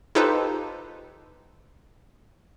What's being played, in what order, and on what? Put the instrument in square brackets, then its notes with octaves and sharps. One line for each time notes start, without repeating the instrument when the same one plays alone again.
[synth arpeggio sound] D#4 F4 G4 A4 B4 C5